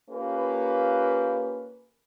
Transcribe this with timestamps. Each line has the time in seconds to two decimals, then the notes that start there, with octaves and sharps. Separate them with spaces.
0.10 A#3 C#4 F4 G4 B4